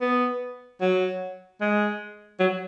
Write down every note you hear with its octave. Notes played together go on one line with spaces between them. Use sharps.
B3
F#3
G#3
F#3